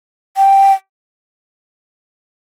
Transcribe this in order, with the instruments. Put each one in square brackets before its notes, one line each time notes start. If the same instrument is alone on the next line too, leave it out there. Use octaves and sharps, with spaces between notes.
[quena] G5